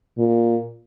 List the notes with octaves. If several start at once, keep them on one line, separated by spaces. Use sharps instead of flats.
A#2